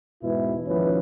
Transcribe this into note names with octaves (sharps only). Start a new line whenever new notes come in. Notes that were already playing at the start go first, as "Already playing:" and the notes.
E2 G#2 B2 E3 G#3 E4
D#2 F3 C#4 E4 F#4 B4